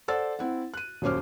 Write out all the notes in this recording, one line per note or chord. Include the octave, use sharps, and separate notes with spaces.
A4 C5 D5 F#5 E6 A6
C4 E4 F#5
F#6 D#7
D#1 F#2 C#4 C5 D6 F6